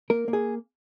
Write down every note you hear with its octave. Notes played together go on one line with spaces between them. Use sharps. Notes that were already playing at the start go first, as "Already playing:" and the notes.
A#3 A#4
A#3
G#4